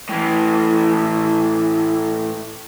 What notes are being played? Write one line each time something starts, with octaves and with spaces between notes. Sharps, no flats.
A2 E3